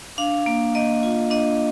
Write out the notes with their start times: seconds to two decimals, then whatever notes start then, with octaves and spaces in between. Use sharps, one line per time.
0.18 D4 F5
0.46 A#3
0.75 A#3 D#5
1.03 F4
1.31 D4 D#5